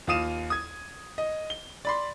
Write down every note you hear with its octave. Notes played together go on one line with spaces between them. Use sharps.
D#2 F4 F5 D#6 D#7 E7
D#6 G#6
D#5
G7
D5 B5 C6